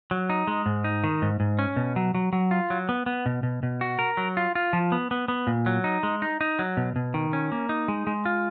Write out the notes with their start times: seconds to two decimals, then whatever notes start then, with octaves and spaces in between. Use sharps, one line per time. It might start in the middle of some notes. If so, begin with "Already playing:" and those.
0.11 F#3
0.30 D#4
0.47 G#3
0.66 G#2
0.84 D#4
1.04 D#3
1.22 G#2
1.40 G#2
1.59 C#4
1.76 B2
1.96 F#3
2.15 F#3
2.33 F#3
2.51 F4
2.70 F#3
2.89 B3
3.06 B3
3.26 B2
3.43 B2
3.63 B2
3.81 F#4
3.99 A#4
4.17 F#3
4.37 F4
4.55 F4
4.73 F3
4.92 B3
5.11 B3
5.28 B3
5.47 A#2
5.66 F#3
5.84 D#4
6.03 G#3
6.22 D#4
6.41 D#4
6.59 F#3
6.77 B2
6.96 B2
7.14 D#3
7.33 C#4
7.52 A#3
7.69 D#4
7.88 G#3
8.07 G#3
8.25 F4